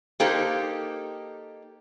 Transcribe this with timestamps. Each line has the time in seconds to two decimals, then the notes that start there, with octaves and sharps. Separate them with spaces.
0.20 A#3 D#4 G4 A4 C5